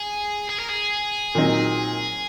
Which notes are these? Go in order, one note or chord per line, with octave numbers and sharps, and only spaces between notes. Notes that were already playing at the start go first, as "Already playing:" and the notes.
Already playing: G#4
G#4
A#4
G#4
A#2 F#3 C4 D#4